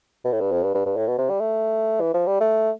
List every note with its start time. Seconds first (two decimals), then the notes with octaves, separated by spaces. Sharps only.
0.24 B2
0.32 A2
0.41 G2
0.51 F2
0.63 G2
0.75 G2
0.86 G2
0.97 A2
1.07 B2
1.18 C3
1.30 G3
1.40 A3
2.00 E3
2.14 F3
2.27 G3
2.41 A3